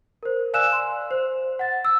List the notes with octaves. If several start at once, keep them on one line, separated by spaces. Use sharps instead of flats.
A#4 C5
D5 F5 G#5 E6 F#6 E7
C6
C5
F#5 A6
E6